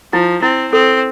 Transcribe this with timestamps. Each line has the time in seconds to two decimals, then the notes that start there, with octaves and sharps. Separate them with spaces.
0.13 F3 E4
0.42 C4 E4
0.72 C4 A4